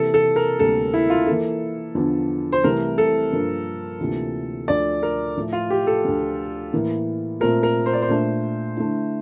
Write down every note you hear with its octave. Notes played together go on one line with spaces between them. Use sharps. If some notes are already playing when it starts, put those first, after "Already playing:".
Already playing: C3 E3 A#3 A4
A4
A#4
D2 C3 G3 A#3 A4
E4
F4
E3 A#3 E4 A4
E2 D3 F3
C5
C2 C3 E3 A3 A#4
A4
G2 F3 A#3
D2 C3 E3 A#3 F4
D2 D3 F3 D5
A#4
A2 F3 A3
F4
G4
A4
D2 D3 F3
A2 E3 A#3
A#2 A3 C4 F4 A#4
A#4
C5
D5
C5
A#2 A3 D4
D3 A3 E4